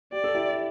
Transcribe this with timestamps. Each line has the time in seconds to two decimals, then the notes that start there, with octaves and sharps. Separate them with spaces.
0.12 G4 D5
0.24 A4
0.35 E4 G4